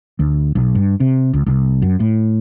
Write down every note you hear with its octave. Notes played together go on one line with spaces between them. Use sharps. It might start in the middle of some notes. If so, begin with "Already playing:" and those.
D2
B1
G2
C3
C#2
C2
F#2
A2